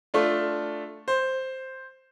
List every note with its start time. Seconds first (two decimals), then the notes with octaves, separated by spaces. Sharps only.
0.14 A3 D4 F4
1.08 C5